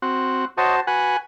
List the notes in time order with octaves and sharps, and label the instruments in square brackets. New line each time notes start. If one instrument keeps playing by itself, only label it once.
[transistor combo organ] C4 F#4
[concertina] F#4 C5 A5 [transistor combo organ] C#5 D#5
[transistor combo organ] F#4 B4 F#5 [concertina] G#5